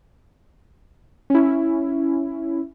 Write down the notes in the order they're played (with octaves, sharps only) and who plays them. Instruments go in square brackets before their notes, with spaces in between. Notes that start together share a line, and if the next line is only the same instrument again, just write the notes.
[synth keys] C#4 E4